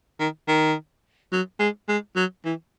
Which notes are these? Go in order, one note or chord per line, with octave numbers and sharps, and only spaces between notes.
D#3
D#3
F#3
G#3
G#3
F#3
E3